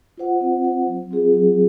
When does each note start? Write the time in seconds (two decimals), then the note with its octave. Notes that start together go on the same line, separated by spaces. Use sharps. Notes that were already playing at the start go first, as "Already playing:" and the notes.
0.18 F4 C5 F#5
0.41 C4
0.64 F4 C5 F#5
0.87 F#3
1.11 C4 F4 G#4
1.33 F#3